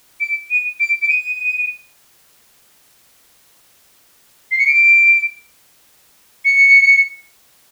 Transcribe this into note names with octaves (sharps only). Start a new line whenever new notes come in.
D7
D#7
D7
D7
D#7
C7
C#7
D7
C#7